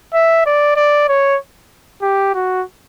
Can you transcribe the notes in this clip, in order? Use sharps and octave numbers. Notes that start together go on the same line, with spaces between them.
E5
D5
D5
C#5
G4
F#4